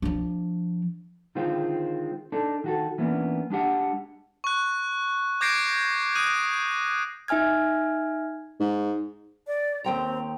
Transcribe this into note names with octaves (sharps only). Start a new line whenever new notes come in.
F3 D4
D3 D#3 G#3 C4 F4
D4 D#4 A4
D#3 F#4 A4
E3 A#3 B3 C#4 D4
G#3 D4 G4 F#5
C#6 F#6
D6 G6 G#6 A#6 C7 D7
D#6 F#6 D#7
D#4 E5 G#5 F6 G#6
G#2
D5
D#2 C4 G5 A#5